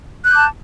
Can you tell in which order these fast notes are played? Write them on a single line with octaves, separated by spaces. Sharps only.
F#6 G6 D6 A5